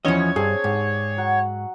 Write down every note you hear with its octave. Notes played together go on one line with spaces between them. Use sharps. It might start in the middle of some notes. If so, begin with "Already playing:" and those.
E2 F3 C#4 E4 C#5 D#5
G2 C4 D4 G#4
G#2 G4 C#6
F#3 F#5